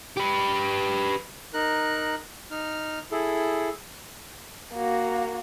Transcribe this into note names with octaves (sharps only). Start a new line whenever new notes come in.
G4 B4
D#4 A#4 F#6
D#4 F6
E4 G#4 A4
A#3 F#4